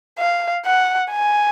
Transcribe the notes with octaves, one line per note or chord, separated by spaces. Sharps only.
F5
F#5
G#5